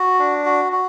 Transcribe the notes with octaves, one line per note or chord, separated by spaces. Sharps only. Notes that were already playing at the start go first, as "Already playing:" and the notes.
Already playing: F#4
D4
F#4
F#4